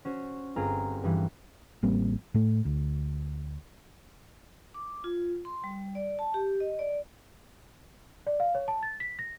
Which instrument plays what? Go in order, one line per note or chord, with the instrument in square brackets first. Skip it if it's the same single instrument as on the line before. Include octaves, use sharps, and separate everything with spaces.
[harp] C#4 F#4 C5
G1 C4 F4 G#4 A#5 F6
G2 E3 G3
[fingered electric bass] A1 G3 A#3 C4
A2 A3
D2
[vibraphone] D6
F4
C6
G3
D5
A5
G4
D#5
D5
[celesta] D5
F5
C#5
A5
A6
B6
A#6